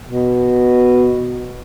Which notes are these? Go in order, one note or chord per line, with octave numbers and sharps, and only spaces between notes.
B2